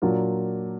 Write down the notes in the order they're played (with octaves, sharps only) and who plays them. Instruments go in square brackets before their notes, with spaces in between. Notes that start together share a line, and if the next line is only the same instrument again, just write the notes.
[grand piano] A#2 F#3 A#3 D4 F4